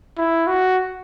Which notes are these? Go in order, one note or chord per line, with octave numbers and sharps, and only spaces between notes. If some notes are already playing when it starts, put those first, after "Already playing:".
E4
F#4